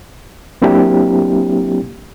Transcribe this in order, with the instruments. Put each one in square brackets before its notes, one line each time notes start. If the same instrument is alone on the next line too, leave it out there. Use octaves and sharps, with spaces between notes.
[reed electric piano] F#3 A#3 C4 D4 E4 G4